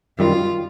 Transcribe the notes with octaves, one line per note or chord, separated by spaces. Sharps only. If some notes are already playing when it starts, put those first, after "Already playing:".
F#2 D#3 G3 F4